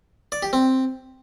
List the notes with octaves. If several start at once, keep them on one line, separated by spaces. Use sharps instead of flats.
D5
G4
C4